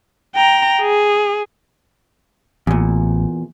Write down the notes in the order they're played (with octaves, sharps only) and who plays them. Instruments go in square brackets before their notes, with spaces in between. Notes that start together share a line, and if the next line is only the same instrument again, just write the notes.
[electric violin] G5 A#5
G#4
[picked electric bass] A1 [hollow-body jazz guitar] E2 A#2